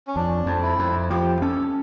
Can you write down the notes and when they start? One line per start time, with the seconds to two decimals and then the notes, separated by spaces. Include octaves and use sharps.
0.07 C#4
0.15 F2 D4
0.46 F2
0.63 E4
0.79 F2
1.10 F3 G4
1.41 C#4 A4